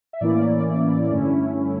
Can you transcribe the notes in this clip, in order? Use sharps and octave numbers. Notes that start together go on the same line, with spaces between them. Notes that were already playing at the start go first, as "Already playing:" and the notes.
E5
A2 E3 A#3 C#4 E4 D5
G2 D3 A3 C#4 E4